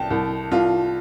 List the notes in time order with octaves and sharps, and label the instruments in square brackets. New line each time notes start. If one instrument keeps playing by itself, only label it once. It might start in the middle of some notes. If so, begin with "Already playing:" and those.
Already playing: [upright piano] C2 G5 A5
C2
C2 F4